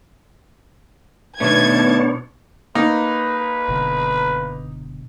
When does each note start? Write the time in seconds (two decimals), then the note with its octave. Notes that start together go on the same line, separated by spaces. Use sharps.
1.40 B2 D#3 A3 B3 D4 C#5 A5 G#6
2.75 A#3 D#4 B4
3.68 F#1 B2 D3